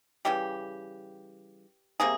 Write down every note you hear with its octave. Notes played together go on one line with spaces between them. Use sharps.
C#3 E3 G3 G4
C3 G3 A#3 G#4